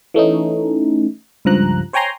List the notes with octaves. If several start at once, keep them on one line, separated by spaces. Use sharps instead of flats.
E3 A3 C#4 D#4
C#2 G2 F3 A#5 F#6
C5 C#5 G5 G#5 A#5 C6